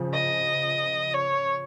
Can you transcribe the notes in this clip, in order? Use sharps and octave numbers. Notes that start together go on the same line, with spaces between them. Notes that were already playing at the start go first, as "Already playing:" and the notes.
Already playing: C#3 F3
D#5
C#5